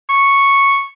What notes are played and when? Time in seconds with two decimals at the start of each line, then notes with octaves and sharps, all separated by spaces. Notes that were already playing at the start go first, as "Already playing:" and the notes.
0.09 C#6